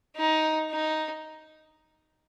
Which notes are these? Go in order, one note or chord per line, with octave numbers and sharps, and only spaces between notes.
D#4
D#4